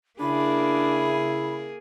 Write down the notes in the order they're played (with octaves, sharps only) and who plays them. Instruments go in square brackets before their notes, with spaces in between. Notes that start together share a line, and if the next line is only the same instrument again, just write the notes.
[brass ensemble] C#3 E4 [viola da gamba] A#3 G#4 [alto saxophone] D4 [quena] B5